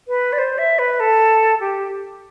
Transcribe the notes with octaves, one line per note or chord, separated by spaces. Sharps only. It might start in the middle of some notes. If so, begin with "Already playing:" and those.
B4
D5
C5
E5
B4
A4
G4